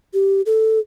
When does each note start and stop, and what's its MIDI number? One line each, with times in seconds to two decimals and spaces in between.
0.14 0.42 67
0.46 0.79 69